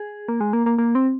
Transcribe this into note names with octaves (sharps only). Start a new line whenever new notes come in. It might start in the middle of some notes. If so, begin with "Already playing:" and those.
Already playing: G#4
A#3
G#3
A#3
A#3
A#3
C4